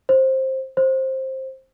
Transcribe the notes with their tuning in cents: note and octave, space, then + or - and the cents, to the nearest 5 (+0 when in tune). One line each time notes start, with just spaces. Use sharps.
C5 +15
C5 +15